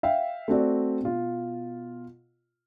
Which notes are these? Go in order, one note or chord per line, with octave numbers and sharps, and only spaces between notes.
E5 F5 G5
A3 C4 F#4 D5
B2 F4